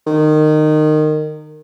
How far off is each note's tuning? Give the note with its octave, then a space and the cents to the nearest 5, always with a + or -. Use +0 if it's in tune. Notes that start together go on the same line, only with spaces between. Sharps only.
D#3 -20